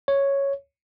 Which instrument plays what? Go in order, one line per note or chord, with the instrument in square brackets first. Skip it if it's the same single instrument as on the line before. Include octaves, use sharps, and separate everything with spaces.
[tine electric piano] C#5